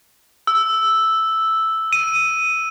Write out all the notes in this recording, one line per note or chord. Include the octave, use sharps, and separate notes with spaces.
E6
D#7